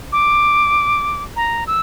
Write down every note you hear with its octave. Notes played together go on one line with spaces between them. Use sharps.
D6
A#5
E6